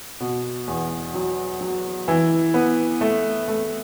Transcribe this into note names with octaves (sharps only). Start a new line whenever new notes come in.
B2
E2
F#3
F#3
E3
B3
A3
A3